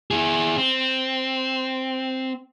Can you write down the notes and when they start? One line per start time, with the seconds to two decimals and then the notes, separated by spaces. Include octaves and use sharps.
0.11 E4 G#4
0.57 C4